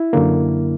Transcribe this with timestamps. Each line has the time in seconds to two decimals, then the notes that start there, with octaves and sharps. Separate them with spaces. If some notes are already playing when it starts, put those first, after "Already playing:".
Already playing: E4
0.13 F#2 D3 A#3